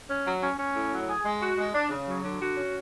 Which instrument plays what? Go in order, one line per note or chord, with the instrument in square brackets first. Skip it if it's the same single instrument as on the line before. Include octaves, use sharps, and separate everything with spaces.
[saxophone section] C#4
F#3
C#4
C#4
A2
F#3
G#4
G#3
F#4
G#3
D4
C#3
F#3
D3
F#4
C#4